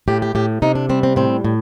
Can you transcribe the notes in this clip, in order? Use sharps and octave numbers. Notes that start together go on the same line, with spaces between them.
A2 G4
G4
A2 G4
C3 D#4
D4
G3 C4
C4
A2 C4
A2